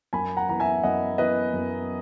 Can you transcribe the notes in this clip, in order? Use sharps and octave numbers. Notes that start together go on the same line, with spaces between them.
F#2 G#5 B5
F#5 A#5
E3 B3 A#5
E5 G#5
F#2 D#5 F#5
E3 B3 B4 D#5
F#2